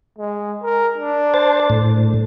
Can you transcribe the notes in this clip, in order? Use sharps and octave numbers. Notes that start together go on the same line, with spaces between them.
G#3
A#4
D4
C5 A5
A2